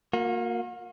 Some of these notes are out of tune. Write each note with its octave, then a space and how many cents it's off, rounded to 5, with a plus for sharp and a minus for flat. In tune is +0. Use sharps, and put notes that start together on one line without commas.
A#3 -5 F#4 -45